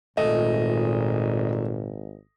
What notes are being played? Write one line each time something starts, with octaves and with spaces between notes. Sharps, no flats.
G#1 A#2 A3 D#5